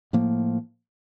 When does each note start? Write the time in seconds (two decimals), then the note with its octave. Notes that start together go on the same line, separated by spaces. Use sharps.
0.13 A2 F3 A#3